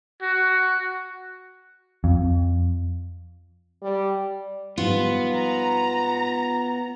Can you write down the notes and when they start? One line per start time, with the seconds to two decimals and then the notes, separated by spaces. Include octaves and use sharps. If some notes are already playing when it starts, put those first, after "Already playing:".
0.22 F#4
2.04 F2
3.82 G3
4.78 G#2 F3 G3 B3 F4
5.32 A#5